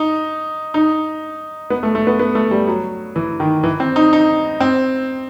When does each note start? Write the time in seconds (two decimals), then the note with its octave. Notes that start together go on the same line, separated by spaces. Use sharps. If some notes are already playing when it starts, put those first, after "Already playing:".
Already playing: D#4
0.74 D#4
1.70 B3
1.83 A3
1.95 A3
2.07 B3
2.19 B3
2.35 A3
2.51 G3
2.67 F#3
3.16 E3
3.40 D#3
3.64 E3
3.80 C4
3.96 D#4
4.13 D#4
4.61 C4